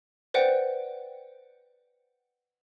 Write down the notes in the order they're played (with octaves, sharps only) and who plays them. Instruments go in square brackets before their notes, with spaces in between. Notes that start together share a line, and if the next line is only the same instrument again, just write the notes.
[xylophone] B4 C5 D5 F#5 G5